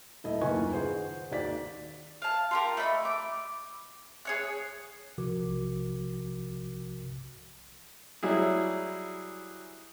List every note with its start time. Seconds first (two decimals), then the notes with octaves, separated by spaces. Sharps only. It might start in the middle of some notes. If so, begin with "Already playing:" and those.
0.24 D#1 A3 E4 D#5
0.41 F#1 D#2 F4 B4 G#5 C#6
0.72 G#4 C5 F#5
1.32 D#2 F#4 D5 B6
2.22 F5 A5
2.51 F4 G4 A#4
2.77 A3 D#5 B5
3.05 D6
4.25 G#4 C#5 F#6
5.18 B1 C3 F3 F#4 A#4 D6
8.23 F#3 G3 E4 G#4